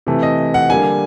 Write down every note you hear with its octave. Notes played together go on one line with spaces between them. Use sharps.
C3 E3 A3
D#5
F#5
D3 G3 A#3 G#5